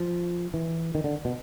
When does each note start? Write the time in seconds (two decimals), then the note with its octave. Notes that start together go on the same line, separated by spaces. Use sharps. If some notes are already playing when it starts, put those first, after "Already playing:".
Already playing: F3
0.54 E3
0.95 D#3
1.04 D3
1.25 B2